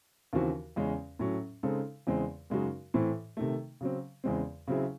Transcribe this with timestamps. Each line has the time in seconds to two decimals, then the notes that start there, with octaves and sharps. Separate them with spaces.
0.33 D#2 C#3 E3 C4 F#4
0.76 E2 C#3 G#3 C#4
1.19 A2 F#3 C#4
1.63 C#3 G#3 C4 D#4 A4
2.07 E2 C#3 G#3 C4
2.50 F#2 C#3 G#3 D#4 F#4
2.94 A2 E3 C4
3.37 C3 D#3 A3
3.81 C#3 F#3 C4
4.24 E2 C#3 G#3 C4
4.67 C#3 F#3 C4 E4 G#4